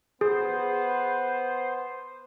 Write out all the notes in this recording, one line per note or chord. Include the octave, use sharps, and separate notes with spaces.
B3 G#4 C5